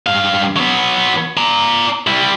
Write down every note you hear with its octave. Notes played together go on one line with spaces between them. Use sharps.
G2 F5
F#3 B3
D5 A#5
G3 E4